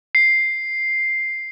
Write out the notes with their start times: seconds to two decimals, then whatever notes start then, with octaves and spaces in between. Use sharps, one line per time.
0.15 C7